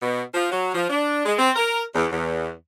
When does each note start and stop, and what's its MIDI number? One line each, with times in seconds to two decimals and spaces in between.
0.02 0.22 47
0.34 0.49 53
0.52 0.73 54
0.74 0.87 53
0.90 1.22 62
1.26 1.34 56
1.39 1.51 60
1.56 1.81 70
1.95 2.06 40
2.12 2.50 40